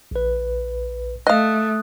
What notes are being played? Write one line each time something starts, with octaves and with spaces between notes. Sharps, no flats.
A#1 B4
A3 D#5 F5 D#6 F#6